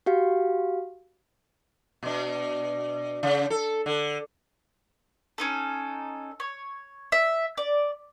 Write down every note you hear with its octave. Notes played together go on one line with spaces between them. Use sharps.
F#4 G4 F5
B2 D4
C#3
A4
D3
C#4 D#4 A4
C#5
E5
D5